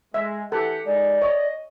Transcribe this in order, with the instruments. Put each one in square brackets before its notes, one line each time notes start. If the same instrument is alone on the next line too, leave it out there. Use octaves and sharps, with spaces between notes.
[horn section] G#3 [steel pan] E5
[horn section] E3 G4 F#5 [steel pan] A4
[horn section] G#3 D#4 [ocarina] D5
[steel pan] C#5 [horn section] D#5